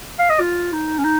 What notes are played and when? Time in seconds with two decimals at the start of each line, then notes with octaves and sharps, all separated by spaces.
0.19 F5
0.30 D#5
0.40 F4
0.73 D#4
0.98 C#4
1.04 D#4